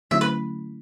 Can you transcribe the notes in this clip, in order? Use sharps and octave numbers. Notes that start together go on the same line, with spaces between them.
D3 F#3 A3 C#4 E4 E5
B4